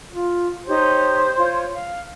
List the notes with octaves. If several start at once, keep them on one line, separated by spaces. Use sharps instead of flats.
F4
D#4 G4 C5 C#5
F4 C#5
F5